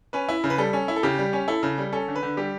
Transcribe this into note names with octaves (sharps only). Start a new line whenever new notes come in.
C#4 B4
E4
C#3
B4
G3 A4
C#4
E4
A4
C#3 G4
G3
C#4
E4 A4
C#3
G3
C#4 A4
D3
B4
D3
G3 G4